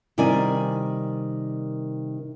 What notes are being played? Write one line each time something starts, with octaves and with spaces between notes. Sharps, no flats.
C3 D#3 G3 D5 G#5